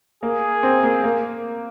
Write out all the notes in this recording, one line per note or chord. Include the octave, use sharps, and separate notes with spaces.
A#3 G#4
C4
A#3
A#3